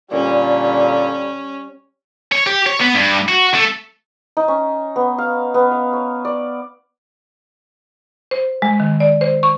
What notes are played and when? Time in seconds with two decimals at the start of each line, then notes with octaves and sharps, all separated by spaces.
0.12 A#2 D3 G3 C#4
2.32 C#5
2.46 G4
2.66 C#5
2.81 B3
2.94 G2
3.28 F#4
3.54 A3
4.37 D#4
4.48 C#4
4.96 B3
5.18 F5
5.54 B3
5.72 F5
5.93 C#5
6.25 D5
8.31 C5
8.62 G#3
8.80 D#3
9.00 D5
9.21 C5
9.43 C#6